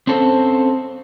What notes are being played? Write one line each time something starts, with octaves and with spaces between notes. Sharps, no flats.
C4 C#4 A4 C5